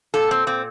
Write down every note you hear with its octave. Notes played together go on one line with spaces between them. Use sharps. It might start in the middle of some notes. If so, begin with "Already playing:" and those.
A#2 A4
C4
A#2 C4